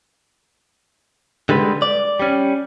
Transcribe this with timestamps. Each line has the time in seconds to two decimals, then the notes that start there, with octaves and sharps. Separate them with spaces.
1.49 D3 G3 G#3 B4
1.82 D5
2.20 G3 C#4